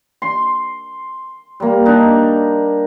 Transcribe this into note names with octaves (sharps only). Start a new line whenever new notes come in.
C6
G3 A#3
D4 D#4